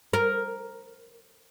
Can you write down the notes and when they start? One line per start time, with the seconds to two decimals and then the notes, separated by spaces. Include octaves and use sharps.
0.13 A#4